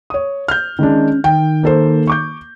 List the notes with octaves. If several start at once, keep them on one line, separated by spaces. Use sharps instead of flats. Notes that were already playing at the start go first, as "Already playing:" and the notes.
C#5 D#6
F6 G6
D#3 G#3 C#4 D4
D#3 G5
A#3 A4 C5
C#6 D6 G6